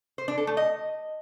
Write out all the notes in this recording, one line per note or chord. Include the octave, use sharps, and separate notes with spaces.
C5
D4
A4
A3
D#5